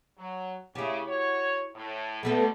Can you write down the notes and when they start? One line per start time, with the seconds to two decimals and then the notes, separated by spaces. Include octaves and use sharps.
0.18 F#3
0.75 C#3 E4 G4
1.07 F#4 C#5
1.75 A2
2.23 B2 D3 G3 A3 B3 A4